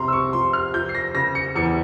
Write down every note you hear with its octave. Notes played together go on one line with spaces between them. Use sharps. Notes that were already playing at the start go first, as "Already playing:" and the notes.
Already playing: C2 C3 A#5 C6
E6
C#6
F3 C6
F6
F3 G6
C7
A#6
C#3 A#6
C#7
E2 C#7